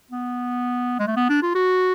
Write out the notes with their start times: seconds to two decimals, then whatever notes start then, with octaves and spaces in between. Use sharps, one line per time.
0.11 B3
0.99 G#3
1.07 A3
1.16 B3
1.29 D4
1.42 F4
1.55 F#4